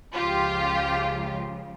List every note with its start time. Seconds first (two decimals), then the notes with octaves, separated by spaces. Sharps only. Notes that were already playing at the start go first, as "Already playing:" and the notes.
0.14 C#2 C#3 F3 F4 G4